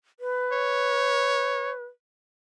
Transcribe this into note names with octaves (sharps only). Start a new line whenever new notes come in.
B4
C#5